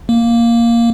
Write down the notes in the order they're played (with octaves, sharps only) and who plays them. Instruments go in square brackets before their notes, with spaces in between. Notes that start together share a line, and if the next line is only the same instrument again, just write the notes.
[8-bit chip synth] A#3